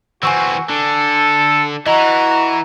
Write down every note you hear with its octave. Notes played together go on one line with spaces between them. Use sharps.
E3 C4 F#4 G#5 C#6 E6
D3 A4
E3 F#4 D#5 A#5